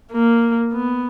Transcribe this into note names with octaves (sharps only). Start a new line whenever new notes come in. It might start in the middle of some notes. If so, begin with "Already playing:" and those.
A#3
B3